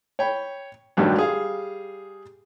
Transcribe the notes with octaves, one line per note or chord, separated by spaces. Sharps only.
C#5 G5 B5
D2 G2 D3 D#3 F#3 D4
G3 G#4 F5